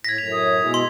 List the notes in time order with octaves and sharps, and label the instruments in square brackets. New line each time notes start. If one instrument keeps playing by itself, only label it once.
[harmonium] A2 [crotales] G#6 B6 [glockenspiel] A#6
[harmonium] F#2 A2 [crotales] F7
[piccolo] D#6
[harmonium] B2 G#3 E4
[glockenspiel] C6